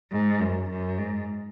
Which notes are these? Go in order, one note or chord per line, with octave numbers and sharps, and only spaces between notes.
G#2
F#2
F#2
G#2